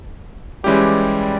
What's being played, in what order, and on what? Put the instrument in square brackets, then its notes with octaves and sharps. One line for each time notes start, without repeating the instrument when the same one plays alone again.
[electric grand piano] E3 G#3 C#4 E4 G4 [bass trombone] G3